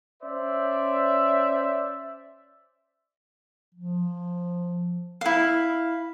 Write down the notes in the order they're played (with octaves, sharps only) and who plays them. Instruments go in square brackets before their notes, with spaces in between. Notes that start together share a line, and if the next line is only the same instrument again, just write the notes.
[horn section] C#4 C5 D5 E5
[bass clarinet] F3
[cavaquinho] E4 F5